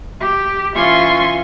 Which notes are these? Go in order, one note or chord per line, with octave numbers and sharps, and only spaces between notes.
G4
E3 C#4 F4 G#5 C6 C#6